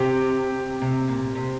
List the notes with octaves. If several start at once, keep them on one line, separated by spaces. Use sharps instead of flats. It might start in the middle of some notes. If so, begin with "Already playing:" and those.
Already playing: C3 G4
C3
A#2
C3